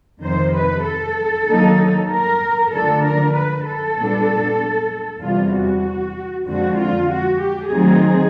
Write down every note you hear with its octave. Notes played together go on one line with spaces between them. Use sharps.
F2 C3 D#3 C5
B4
A4
D#3 F#3 A#3 D#4
A#4
D3 F3 A3 D4 A4
A#4
B4
A4
A#2 G3 B3 D4
E2 C3 E3 G3 F4
F#4
F2 D3 F3 G#3 C4 F#4
F4
F#4
G4
D#3 F#3 A3 C4 D#4 G#4